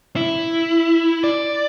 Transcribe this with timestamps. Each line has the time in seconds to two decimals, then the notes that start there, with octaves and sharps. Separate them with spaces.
0.16 E4
1.24 D5